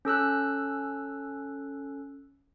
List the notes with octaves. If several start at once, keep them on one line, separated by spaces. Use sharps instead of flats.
C#4 A4 E6 F#6